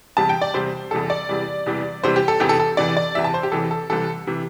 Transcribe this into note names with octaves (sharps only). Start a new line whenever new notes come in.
E2 C3 G3 A5
G5
D5
E2 C3 G3 C5
E2 C3 E3 G3 A4
D5
E2 C3 E3 G3
E2 C3 E3 G3
E2 C3 E3 G3 C5
G4
A4
E2 C3 E3 G4
A4
A4
E2 C3 E3 D5
D5
E2 C3 E3 E5
A5
C5
G4
E2 C3 E3 A4
A4
C2 C3 E3 A4
C3 E3